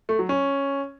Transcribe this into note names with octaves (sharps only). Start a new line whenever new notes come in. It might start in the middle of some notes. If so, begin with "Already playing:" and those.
A3
F#3
C#4